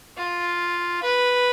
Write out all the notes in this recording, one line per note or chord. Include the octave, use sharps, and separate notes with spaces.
F4
B4